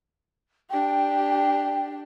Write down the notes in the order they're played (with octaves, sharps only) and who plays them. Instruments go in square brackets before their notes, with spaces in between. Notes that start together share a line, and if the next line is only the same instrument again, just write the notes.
[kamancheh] D4 G4 [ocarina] G5